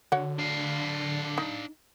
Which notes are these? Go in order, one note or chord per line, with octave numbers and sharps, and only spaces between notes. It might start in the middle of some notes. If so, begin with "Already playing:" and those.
D3 F#4 C#5 F#5
D4 F5
D#4